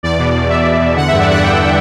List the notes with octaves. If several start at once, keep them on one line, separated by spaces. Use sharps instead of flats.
E2 D5
B2
E2
E2 E5
E2
E2
D3 F#5
G2 E5
D5
D3 F#5
G2 G5
D3